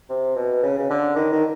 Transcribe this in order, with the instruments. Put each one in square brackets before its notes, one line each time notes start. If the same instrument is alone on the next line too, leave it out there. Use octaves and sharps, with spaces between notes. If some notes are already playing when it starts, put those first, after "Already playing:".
[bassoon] C3
B2
C#3
C#3
D3
D#3
D#3